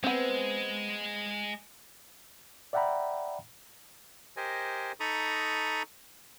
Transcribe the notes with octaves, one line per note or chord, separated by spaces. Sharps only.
G#3 B3 C4
D5 E5 F#5 G5 A#5 B5
G4 A#4 C5 D#5 G#5
D#4 A4 A#5 B5 C#6 D#6